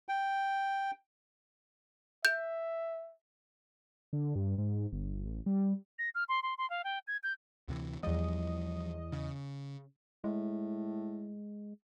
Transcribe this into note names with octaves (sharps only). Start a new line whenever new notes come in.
G5
E5 G6
D3
G2
G#2
G1
A1
G3
A#6
F6
C6
C6
C6
F5
G5
G#6
G6
D2 C3 E3
E2 F3 G3 D#5
C#3
A2 G#3